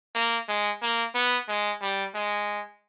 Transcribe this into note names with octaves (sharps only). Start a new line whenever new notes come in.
A#3
G#3
A#3
B3
G#3
G3
G#3